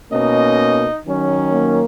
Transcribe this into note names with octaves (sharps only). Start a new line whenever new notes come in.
B2 A#3 C#4 D#4 D#5
D#3 F#3 C#4
A#3 A#4